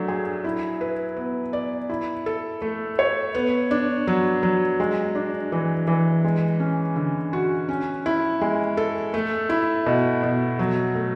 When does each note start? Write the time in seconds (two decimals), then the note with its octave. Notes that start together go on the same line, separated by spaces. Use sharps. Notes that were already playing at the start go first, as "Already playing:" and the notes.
Already playing: F#3 A3 D4
0.08 G#4
0.44 E4
0.81 B4
1.17 B3
1.53 D5
1.89 E4
2.26 A4
2.62 A3
2.99 C#5
3.35 B3
3.71 D4
4.07 F#3
4.43 F#3
4.80 G#3
5.15 D4
5.52 E3
5.87 E3
6.24 G#3
6.60 C#4
6.96 D3
7.33 F#4
7.69 C#4
8.06 E4
8.41 G#3
8.77 A4
9.14 A3
9.49 E4
9.86 B2
10.23 B2
10.59 F#3
10.95 A3